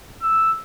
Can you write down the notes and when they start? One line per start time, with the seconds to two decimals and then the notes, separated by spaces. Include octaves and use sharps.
0.22 E6